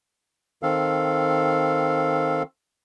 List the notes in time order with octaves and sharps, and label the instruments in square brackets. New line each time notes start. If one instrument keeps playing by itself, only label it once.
[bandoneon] D#3 C4 A4 F5